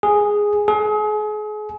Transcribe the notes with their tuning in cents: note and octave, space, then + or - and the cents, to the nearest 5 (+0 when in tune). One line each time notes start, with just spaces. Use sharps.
G#4 -5
G#4 +35